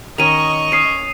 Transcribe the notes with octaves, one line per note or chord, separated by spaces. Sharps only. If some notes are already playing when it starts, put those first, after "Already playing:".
D#3 C#4 D#5 C#6 D#7 F7
C#4 D#6 C7 D#7